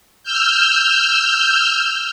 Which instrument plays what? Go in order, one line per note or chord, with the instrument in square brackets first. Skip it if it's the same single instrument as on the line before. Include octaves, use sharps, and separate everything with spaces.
[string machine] E6 F6 G6